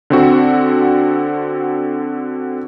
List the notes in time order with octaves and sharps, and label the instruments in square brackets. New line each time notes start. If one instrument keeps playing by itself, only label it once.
[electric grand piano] D3 C4 F#4